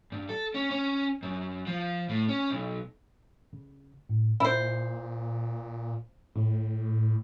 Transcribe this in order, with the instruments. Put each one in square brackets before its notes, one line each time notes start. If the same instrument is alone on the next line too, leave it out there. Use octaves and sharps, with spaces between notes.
[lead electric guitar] G2
A4
C#4
C#4
F#2
F3
A2
C#4
B1
[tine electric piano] C#3
A2
[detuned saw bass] A#2 [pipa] E4 C5
[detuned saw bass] A2